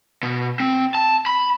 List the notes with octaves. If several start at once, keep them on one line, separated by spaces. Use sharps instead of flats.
B2
C4
A5
B5